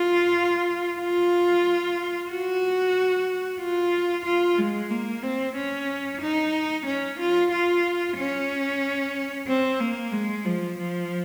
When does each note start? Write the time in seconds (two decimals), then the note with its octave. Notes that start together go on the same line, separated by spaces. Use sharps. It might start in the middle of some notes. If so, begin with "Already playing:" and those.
Already playing: F4
0.99 F4
2.30 F#4
3.61 F4
4.25 F4
4.58 G#3
4.90 A#3
5.23 C4
5.56 C#4
6.21 D#4
6.86 C#4
7.19 F4
7.51 F4
8.17 C#4
9.47 C4
9.80 A#3
10.12 G#3
10.45 F3
10.78 F3